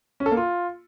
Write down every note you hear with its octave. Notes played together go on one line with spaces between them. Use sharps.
C#4
A4
A#3
F4